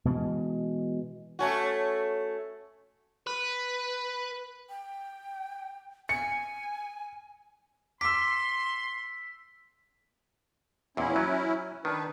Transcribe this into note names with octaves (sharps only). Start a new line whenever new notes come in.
B2 E3 G#3
A3 C#4 F#4
B4
G5
G#5 C#7
C6 D6 E6 B6
E2 A#2 C#4 E4
F#3
D#3 D4 B4